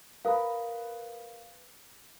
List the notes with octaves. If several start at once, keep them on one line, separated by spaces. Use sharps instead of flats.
A#4 B4 F5 B5 D#6